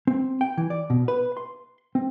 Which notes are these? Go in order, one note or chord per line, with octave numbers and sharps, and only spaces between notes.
C4
G5
E3
D5
B2
B4
C6
C4